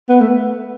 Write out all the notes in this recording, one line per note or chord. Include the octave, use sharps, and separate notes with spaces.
B3
A3